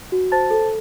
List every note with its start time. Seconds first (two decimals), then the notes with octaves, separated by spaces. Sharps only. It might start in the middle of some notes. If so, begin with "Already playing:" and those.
0.12 F#4
0.32 C5 A5 A6
0.51 A4